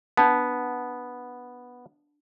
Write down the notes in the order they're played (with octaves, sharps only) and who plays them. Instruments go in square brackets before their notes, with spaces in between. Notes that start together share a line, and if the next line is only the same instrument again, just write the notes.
[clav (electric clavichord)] B3 [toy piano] D4 A5